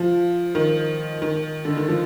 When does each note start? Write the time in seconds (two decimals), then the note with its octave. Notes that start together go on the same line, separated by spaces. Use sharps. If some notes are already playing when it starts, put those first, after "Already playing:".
Already playing: F3
0.55 D#3
1.22 D#3
1.65 D3
1.77 D#3
1.88 F3